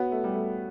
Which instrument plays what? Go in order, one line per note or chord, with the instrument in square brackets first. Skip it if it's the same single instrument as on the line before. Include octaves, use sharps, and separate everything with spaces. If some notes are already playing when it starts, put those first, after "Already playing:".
Already playing: [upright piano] B3 [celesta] F#4 C#5 F#5
[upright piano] A3
G3
A3